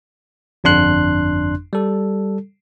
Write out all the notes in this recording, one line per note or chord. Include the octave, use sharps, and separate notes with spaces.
G1 F2 D4 C6 F#6
G3 A4